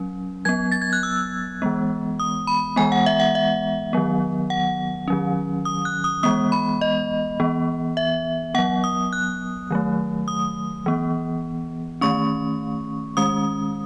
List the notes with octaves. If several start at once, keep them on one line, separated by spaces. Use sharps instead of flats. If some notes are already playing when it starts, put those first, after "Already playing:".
Already playing: F#3 C#4
F#3 B3 G#6
A6
G#6
F#6
E6
E3 G#3 B3
D#6
B5
E3 G#3 B3 G#5
F#5
E5
F#5
E5
D#3 F#3 B3
F#5
D#3 F#3 C#4
D#6
F#6
D#6
E3 G#3 B3 D#6
B5
D#5
E3 B3
E5
F#3 B3 F#5
D#6
F#6
D#3 F#3 A3
D#6
E3 B3
D#3 A3 C#4 C#6
D#3 G#3 C#4 D#6